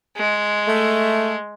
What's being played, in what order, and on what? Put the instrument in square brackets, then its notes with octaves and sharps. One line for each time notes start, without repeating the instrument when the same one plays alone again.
[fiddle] G#3
[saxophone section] A3